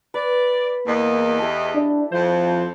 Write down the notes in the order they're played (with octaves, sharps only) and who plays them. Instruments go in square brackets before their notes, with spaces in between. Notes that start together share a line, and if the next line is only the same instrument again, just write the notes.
[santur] B4 [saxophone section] D5
[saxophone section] E2 D#5 [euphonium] A#3
[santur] E4 G4 A4
[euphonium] D4
[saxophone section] F2 C5 [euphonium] F3